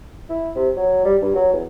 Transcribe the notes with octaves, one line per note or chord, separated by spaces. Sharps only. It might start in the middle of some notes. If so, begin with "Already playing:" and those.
E4
C3
F#3
G3
G2
F#3
E2